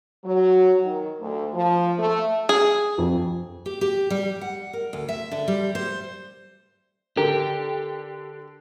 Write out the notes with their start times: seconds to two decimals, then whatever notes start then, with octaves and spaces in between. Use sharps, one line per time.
0.25 F#3
0.83 D#3
1.21 D2
1.53 F3
1.98 A3
2.49 G#4
2.98 F2
3.66 G4
3.81 G4
4.10 G3
4.41 F#5
4.73 A#4
4.93 D2
5.09 E5
5.32 D3
5.48 G3
5.75 C5
7.17 D3 G4 A#4